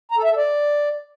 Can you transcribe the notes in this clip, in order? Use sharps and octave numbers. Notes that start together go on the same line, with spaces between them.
A#5
A4
E5
A4
D5